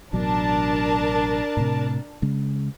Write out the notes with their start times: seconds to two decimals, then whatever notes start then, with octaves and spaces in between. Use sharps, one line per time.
0.13 A1 B2 F#3 D4 A#4 A5
1.57 A2 C3
2.22 C#3 G#3